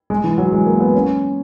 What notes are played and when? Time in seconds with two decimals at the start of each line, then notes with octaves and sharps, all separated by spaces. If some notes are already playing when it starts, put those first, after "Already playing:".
0.10 G#3
0.24 E3
0.38 F#3
0.52 G#3
0.66 A#3
0.80 B3
0.94 C#4